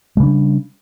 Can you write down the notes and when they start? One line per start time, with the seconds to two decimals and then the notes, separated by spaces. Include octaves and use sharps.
0.17 G#3
0.20 C#3
0.23 D4
0.26 G3